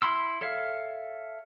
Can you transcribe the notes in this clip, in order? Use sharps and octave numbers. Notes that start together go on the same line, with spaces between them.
E4 B5 C6 E6
A4 C#5 E5 F5